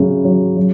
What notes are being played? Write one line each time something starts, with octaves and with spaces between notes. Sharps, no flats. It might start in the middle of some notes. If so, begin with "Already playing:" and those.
Already playing: C#3 F#3
F#3
F#3